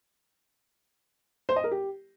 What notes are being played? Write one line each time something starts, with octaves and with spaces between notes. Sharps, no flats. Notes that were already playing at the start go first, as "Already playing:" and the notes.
C5
D#5
A#4
G4